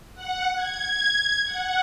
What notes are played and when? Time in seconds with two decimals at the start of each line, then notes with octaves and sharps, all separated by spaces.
0.14 F#5
0.55 G#6
1.44 F#5